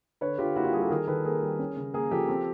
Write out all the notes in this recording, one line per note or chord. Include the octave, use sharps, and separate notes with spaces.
D3 B4 C#5
D3 F4 G4
A#3 E4 F#4
F4 G4
G3 F#4 G#4
G4 A4
D#3 G#4 A#4
D#3 A4 B4
A#3 G#4 A#4
G3
C#4
C#3
A#3 G#4 A#4
F3 G4 A4
C4